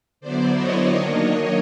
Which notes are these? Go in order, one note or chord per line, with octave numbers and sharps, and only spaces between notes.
D3 F#3 B3 E4 C5 D5
C#5 D#5
D#3 F#3 A#3 D4 C#5 D#5